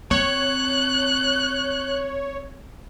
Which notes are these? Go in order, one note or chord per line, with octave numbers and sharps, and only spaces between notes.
C4 C#5 F#6